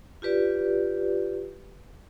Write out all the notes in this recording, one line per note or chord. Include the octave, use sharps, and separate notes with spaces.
F4 G4 B4 D5